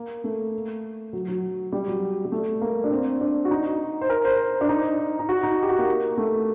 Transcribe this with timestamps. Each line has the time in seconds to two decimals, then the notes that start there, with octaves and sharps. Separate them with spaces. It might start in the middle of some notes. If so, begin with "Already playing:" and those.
Already playing: A#3
0.24 A3
1.13 F#3
1.28 F#3
1.72 G3
1.88 F#3
2.25 G3
2.32 A3
2.62 A#3
2.84 D4
2.91 C4
3.21 D4
3.45 F#4
3.51 D#4
4.01 C5
4.09 A#4
4.25 C5
4.61 D4
4.69 D#4
5.19 D#4
5.29 F#4
5.43 D#4
5.63 G4
5.69 F#4
5.78 A#3
6.17 A3